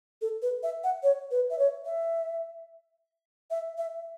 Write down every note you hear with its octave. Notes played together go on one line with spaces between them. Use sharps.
A4
B4
E5
F#5
C#5
B4
E5
C#5
E5
E5
E5